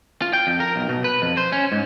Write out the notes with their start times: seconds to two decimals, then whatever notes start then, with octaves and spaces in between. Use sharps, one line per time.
0.22 F4
0.33 G5
0.47 F2
0.60 A#4
0.76 B1
0.89 B2
1.04 B4
1.22 F2
1.37 C5
1.52 C#4
1.72 G#2